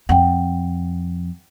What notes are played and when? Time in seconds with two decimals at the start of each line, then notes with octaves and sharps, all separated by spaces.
0.09 F2 F#5 G5